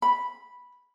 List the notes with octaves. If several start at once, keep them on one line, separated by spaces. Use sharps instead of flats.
B5